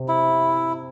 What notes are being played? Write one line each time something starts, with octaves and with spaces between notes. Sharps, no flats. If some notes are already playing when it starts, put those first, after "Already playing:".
Already playing: C3
E4